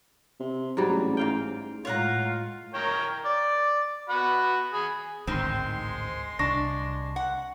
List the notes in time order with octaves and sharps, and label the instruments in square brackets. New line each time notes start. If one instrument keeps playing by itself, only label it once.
[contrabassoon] C3
[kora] G#2 F#3 G3
[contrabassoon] A1
[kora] G#2 F5 G5
[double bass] A2 G#3 [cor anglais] F4 [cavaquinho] C#5 F#5 A#5
[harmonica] A#4 C#5 G5
D5
F#4 F#5 B5
G#4 B5
[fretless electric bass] A1 D2 G#2 [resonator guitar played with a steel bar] D#3 C4 [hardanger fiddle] G#3 C6
[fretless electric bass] C2 [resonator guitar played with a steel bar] D4 [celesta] C#6 A#6
[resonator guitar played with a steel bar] F#5